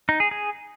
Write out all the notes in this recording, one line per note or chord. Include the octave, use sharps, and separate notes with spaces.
D#4
G#4
G#4